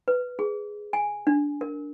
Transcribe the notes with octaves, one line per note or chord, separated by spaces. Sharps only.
B4
G#4
G#5
D4
A#4